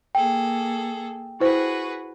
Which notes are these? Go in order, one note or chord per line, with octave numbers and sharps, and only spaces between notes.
A#3 G#4 A4 G5
E4 F#4 G#4 B4 C5